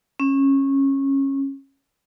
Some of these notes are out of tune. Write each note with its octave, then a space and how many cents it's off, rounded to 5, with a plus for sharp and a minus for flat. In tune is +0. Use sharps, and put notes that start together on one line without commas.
C#4 -20